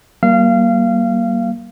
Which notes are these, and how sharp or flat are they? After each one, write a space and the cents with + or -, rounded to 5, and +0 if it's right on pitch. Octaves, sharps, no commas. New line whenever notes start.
G3 -40 A#3 +15 F5 -25